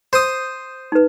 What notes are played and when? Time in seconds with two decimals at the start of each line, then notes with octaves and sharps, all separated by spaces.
0.13 C5 D#6
0.92 D#4 B4